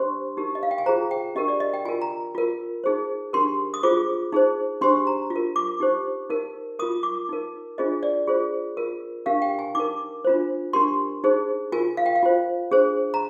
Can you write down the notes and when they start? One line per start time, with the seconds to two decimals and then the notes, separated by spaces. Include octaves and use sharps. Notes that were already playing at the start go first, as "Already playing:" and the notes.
Already playing: D4 G4 C5 C6
0.37 D#4 G4 A#4
0.55 D#5
0.63 F5
0.71 G5
0.78 G#5
0.86 F4 G#4 C5 A#5
1.11 G5
1.35 D4 G4 A#4 D#5
1.48 D5
1.60 D#5
1.73 G5
1.85 F4 A#4 G#5
2.02 A#5
2.35 F4 A#4
2.84 D#4 G#4 C5
3.33 D4 G4 A#4 C6
3.74 D#6
3.83 F4 G#4 C5 D6
4.32 D#4 G#4 C5
4.81 D4 G4 C5 C6
5.07 A#5
5.30 F4
5.36 A#4
5.56 D6
5.80 D#4 G4 C5
6.29 D#4 A#4
6.79 F4 A#4 D#6
7.03 D6
7.29 D#4 A#4
7.78 D4 F4 G#4 C5 D#5
8.03 D5
8.27 F4 G#4 C5
8.77 F4 A#4
9.26 D4 G4 A#4 F5
9.42 G5
9.59 G#5
9.75 D#4 A#4 D6
10.24 D4 F4 C5
10.73 D4 G4 A#4 C6
11.24 D#4 G#4 C5
11.72 F4 A#4 G#5
11.97 F5
12.06 G5
12.16 F5
12.23 F4 C5
12.71 D4 G#4 C5
13.14 A#5